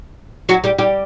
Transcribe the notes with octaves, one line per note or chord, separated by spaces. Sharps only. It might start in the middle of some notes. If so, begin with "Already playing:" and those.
F#3 F#4
G3 G4
G3 G4